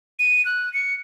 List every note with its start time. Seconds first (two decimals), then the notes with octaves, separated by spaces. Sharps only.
0.19 D#7
0.45 F#6
0.74 C#7